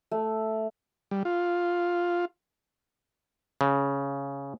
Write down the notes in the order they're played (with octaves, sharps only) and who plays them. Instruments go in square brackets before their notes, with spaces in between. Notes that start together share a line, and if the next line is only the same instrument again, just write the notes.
[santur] A3
[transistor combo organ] G3
F4
[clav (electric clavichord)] C#3